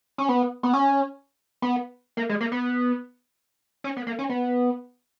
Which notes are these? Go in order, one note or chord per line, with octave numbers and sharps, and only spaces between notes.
C#4
B3
B3
C#4
B3
A#3
G#3
A#3
B3
C#4
B3
A#3
C#4
B3